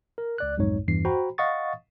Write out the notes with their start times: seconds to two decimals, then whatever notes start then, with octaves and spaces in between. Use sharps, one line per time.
0.18 A#4
0.38 C#2 D5 F#6
0.58 B1 F2 G#2 G#3 D#4 C#5
0.88 E2 G2 E3 C7
1.05 F#4 C5 G5 A#5 B5
1.38 D#5 F5 F#5 C#6 D#6 A6